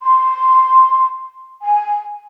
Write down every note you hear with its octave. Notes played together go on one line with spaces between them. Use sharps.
C6
G#5